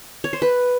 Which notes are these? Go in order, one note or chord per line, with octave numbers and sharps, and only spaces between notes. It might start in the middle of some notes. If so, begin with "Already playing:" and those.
C#5
C5
B4